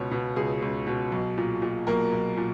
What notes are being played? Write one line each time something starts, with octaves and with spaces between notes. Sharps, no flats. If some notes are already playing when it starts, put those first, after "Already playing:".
Already playing: C#2 B2 C#4 C#5
B2
C#2 G#4
C#2
B2
B1
A#2
A#2
B1 A#3 A#4
B1
A#2